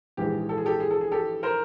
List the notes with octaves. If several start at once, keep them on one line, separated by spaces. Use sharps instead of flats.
A#1 G#2 E3 G#3 G4
A4
G#4
G4 A4
G#4
A4
G#4
G4 A4
A#4 C5